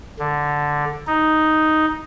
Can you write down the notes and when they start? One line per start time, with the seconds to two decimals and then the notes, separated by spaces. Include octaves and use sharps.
0.19 D3
1.07 D#4